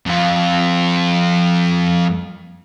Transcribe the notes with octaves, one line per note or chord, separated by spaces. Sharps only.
F2 F4